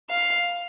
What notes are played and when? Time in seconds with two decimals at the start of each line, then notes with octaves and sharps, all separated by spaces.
0.09 F5